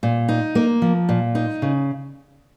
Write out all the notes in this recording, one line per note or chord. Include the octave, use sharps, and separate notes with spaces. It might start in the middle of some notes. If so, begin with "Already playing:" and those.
A#2
D#4
A#3
F3
A#2
D#4
C#3